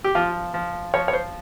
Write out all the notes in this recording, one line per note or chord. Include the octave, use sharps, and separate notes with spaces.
G4
F3 F4
F3
F3 C#5
C#5
C5